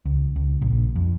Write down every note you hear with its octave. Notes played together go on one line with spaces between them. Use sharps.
C#2
C#2
A#1
F2